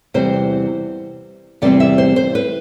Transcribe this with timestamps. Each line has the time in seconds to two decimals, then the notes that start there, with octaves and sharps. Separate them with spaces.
0.14 E2 C3 G3 C5
1.62 E2 C3 G3 C4 D5
1.80 E5
1.98 C5
2.16 C5
2.35 B4